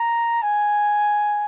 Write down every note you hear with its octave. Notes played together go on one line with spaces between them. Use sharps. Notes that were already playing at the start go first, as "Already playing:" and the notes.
Already playing: A#5
G#5